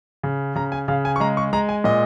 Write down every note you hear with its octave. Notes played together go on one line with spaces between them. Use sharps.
C#3
C#3 A#5
G#5
C#3 F5
G#5
C#6
G#3 A#5
C#6
G#3 A#5
G#5
A#2 D#5